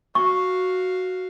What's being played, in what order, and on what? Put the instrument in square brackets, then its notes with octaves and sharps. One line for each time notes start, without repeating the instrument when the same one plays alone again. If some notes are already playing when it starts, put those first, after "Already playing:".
[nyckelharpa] F#4 F5 [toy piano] C#6